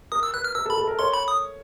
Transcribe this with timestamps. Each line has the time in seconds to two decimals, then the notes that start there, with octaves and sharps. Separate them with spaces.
0.12 A#4 D#6
0.23 E6
0.34 B4 F#6
0.44 F6
0.55 A#4 E6
0.66 A4
0.70 B5
0.77 A4
0.88 A#4
0.99 C#5 C6
1.14 B5
1.28 D#6